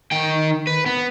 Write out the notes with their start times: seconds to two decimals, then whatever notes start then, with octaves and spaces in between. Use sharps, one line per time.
0.11 D#3 G5
0.67 B4
0.86 B3